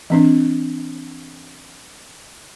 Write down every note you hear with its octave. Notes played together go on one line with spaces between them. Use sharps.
E3 C4 D4